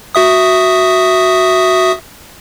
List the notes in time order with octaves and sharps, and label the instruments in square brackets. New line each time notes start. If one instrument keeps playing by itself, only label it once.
[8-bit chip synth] F#4 E5 D#6